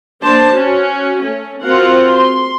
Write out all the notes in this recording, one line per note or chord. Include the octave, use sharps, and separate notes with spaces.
A#3 D4 C5 A5
C#4 F#4
A3 C#4
C4 F4 F#4 A#4 F5 F#5
C6